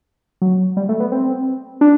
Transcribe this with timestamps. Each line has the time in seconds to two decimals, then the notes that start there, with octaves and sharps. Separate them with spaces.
0.42 F#3
0.77 G3
0.89 A3
1.00 B3
1.12 C4
1.81 D4